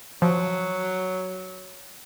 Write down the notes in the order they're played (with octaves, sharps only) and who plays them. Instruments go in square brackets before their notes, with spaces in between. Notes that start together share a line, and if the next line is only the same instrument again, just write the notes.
[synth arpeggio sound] F3 [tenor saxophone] F#3